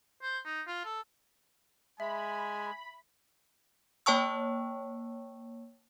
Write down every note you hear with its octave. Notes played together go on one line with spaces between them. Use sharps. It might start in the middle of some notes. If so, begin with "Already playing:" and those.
C5
D#4
F4
A4
G#3 E5 G#5 B5
A#3 C#5 G5 A5 C#6 E6